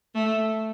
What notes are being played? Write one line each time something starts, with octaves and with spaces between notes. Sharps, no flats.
A3